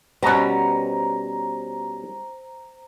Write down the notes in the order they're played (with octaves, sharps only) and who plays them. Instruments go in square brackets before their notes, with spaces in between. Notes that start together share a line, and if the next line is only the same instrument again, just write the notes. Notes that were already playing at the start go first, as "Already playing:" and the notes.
[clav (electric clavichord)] B2 B3 [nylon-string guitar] G3 C#4 [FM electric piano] C5 A#5